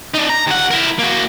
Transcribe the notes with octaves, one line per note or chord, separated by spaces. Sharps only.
D4 D#4
A#5
D#2 F#5
E4 A#4
A#3 F#4